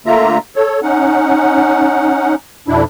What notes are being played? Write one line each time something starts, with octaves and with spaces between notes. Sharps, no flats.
D3 A3 A#3 F4 E5 A#5
A4 C#5
C#4 D#4 F#5
F2 B2 D4 E4